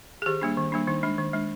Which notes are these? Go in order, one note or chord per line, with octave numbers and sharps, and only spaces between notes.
G#4
D#3 G4
G3 A#3 D4
D#3
G3 A#3 D4
D#3 D#4
G#3 D4
D#3
G#3 D4